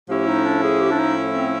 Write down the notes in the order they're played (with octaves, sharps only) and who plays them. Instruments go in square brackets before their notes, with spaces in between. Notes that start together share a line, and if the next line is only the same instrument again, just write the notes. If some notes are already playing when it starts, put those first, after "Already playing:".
[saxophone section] A2 F3 A3 C#4 E4 [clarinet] G4
[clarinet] D#4
D4
G#4
G4
D4
D#4
C4